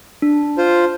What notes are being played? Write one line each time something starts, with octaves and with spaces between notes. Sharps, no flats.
D4
F4 C5